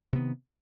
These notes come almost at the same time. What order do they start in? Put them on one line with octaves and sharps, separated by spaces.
C3 B3 D#3